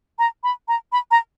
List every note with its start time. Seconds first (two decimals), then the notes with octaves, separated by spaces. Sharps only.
0.19 A#5
0.44 B5
0.68 A#5
0.92 B5
1.11 A#5